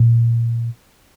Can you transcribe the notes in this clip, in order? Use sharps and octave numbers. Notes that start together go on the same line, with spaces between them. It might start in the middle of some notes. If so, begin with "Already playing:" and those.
Already playing: A#2